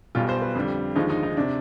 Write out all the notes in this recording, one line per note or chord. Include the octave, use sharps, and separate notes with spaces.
B1 B2 G3 F4
C5
B4
F2 D3 G3
D#2 D3 F3 G#3 D#4
D#4
D#4
C3 D4